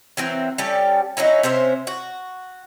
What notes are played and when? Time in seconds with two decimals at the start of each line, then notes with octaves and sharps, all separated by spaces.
0.17 E3 F#3 C4
0.58 G3 C#4 G4 A4
1.17 F#3 C#4 D#4 E4
1.43 C3 C#4 C5 E5
1.87 F#4